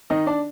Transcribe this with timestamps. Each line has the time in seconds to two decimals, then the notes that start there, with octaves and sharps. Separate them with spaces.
0.10 D#3 D#4 D#5
0.26 D4 D5